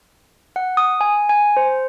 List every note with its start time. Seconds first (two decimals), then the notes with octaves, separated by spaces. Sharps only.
0.56 F#5
0.77 D#6
1.01 G#5
1.29 G#5
1.57 C5